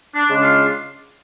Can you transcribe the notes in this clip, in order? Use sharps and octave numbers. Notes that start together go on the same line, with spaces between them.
D4
C#3 G#3 D4
F4